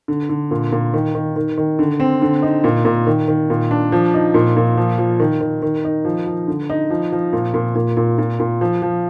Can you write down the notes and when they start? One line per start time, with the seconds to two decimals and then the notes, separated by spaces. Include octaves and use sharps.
0.08 D3
0.29 D3
0.51 A#2
0.72 A#2
0.94 D#3
1.15 D#3
1.36 D#3
1.57 D#3
1.79 D3
2.00 C4
2.22 D3
2.42 D#4
2.64 A#2
2.85 A#2
3.07 D#3
3.28 D#3
3.50 A#2
3.71 D4
3.92 F3
4.14 D#4
4.34 A#2
4.57 A#2
4.77 F3
4.98 F3
5.20 D#3
5.41 D#3
5.62 D#3
5.84 D#4
6.05 F3
6.26 F3
6.47 D3
6.70 D#4
6.90 F3
7.12 F3
7.33 A#2
7.54 A#2
7.75 A#2
7.97 A#2
8.18 A#2
8.40 A#2
8.61 F3
8.82 F3